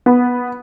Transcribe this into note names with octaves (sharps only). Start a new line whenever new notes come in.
B3